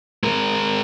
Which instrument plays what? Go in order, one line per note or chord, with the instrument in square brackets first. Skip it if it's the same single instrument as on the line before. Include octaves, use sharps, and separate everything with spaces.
[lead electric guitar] G#3 A#4